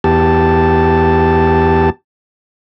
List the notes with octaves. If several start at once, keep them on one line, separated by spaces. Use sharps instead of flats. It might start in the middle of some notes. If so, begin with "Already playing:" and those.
E2 G4 A5